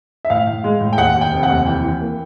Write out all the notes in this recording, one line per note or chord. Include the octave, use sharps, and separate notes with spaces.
E5
A2 F5
A2
G#3
A2
G5
D#2 F#5
D#2
G5
F1
F#5
D#2
E3 G5
E3
A#3